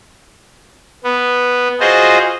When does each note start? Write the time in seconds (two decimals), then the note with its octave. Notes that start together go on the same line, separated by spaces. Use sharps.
1.04 B3
1.80 F4 F#4 G#4 C5 D#5